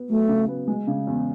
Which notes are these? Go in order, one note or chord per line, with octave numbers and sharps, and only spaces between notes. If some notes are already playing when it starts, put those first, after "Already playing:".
Already playing: B3
F#3 A3
C#3
B3
G#3
C#3
E2